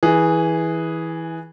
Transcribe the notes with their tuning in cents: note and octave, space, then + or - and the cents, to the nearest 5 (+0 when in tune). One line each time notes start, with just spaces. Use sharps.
E3 -15 G#4 +0